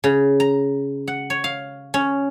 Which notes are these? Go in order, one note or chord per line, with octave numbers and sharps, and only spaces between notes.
C#3
A#5
F#5
C#5
F5
C#4